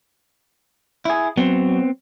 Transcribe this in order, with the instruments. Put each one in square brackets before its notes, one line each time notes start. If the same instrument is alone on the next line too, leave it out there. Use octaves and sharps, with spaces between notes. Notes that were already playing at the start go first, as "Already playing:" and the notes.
[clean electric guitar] E4 G#4
[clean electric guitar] F#3 [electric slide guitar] B3 C4